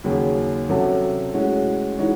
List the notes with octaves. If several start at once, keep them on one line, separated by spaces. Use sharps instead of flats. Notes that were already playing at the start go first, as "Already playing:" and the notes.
D#2 C#3 F#3 C#4 G#4
C3 F#3 C#4 F#4 A4
A2 G#3 C#4 F#4
E3 G#3 D#4 F#4 C#5